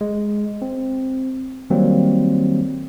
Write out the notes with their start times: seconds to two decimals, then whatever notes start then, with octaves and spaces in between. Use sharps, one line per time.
0.01 G#3
0.62 C4
1.70 D#3 F#3 G3 A#3 C4